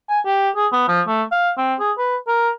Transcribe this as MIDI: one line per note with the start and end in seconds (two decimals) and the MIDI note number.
0.09 0.20 80
0.26 0.49 67
0.56 0.67 68
0.72 0.85 59
0.88 1.01 53
1.07 1.23 57
1.32 1.50 77
1.58 1.74 60
1.80 1.92 68
1.98 2.17 71
2.28 2.49 70